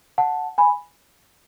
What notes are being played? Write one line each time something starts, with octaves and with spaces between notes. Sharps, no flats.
F#5 A5
G#5 B5